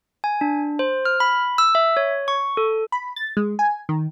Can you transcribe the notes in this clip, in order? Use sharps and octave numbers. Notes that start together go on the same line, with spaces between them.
G#5
D4
C5
F6
B5
E6
E5
C#5
C#6
A4
B5
A6
G#3
G#5
D#3